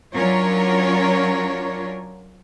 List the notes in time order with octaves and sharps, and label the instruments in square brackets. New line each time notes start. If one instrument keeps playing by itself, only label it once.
[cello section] F#3 C#4 D4 F4 A#4 C#5